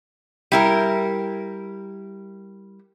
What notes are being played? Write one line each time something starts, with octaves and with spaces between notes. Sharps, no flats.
G3 E4 A#4